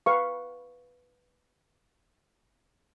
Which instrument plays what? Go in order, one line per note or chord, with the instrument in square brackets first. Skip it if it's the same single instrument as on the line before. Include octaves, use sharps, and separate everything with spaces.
[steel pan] B4 F5 C#6